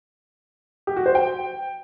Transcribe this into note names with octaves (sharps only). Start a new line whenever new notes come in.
G4
F#4
C5
G5